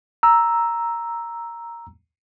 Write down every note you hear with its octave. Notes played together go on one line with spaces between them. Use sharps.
A#5 E6